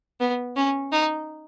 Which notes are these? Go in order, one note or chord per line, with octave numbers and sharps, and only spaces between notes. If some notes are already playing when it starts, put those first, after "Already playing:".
B3
C#4
D#4